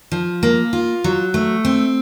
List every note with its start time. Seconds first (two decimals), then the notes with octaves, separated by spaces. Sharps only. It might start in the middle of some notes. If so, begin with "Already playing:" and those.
0.12 F3
0.43 A#3
0.73 F4
1.04 F#3
1.34 A3
1.65 C4